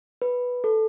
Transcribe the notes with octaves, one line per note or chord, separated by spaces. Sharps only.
B4
A4